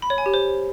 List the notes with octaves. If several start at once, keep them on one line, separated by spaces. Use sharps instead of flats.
B5
C#5
G#5
G4
C5